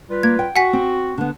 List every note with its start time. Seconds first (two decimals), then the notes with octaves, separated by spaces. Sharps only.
0.10 G3 F4 B4
0.23 A#3 G#6
0.39 G5
0.56 F#4 F#5 G#5 B6
0.73 C4
1.18 D3 B3